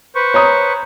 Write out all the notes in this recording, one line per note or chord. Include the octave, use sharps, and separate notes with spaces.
B4 C5 C#6
C#5 A#5 D#6